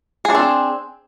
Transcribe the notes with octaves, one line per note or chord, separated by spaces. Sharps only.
C4 D4 G#4